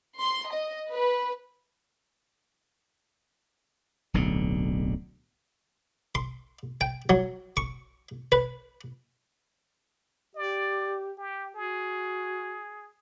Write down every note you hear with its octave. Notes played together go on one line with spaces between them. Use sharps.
C6
D#5
B4
D1 B1 D3
C6
G5
F#3
C#6
B4
G4 D5
G4
F#4 G#4